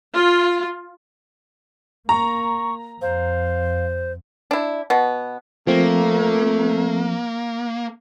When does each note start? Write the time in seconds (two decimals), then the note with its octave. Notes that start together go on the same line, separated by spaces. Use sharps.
0.14 F4
2.09 A#3 A#5 C#6
3.02 F2 C5 F5
4.51 D4 E4
4.90 B2 B3
5.67 F3 A3 A#3 C4